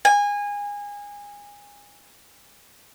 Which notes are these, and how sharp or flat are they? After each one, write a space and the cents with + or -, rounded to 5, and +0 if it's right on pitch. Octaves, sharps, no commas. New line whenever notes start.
G#5 -25